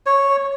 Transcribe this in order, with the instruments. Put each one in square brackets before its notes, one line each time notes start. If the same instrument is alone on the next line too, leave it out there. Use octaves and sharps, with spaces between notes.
[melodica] C#5